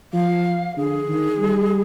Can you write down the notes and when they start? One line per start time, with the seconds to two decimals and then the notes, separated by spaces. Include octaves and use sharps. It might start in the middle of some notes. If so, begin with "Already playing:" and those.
0.13 F3 F5
0.76 D3 G#4
1.08 D#3
1.39 G3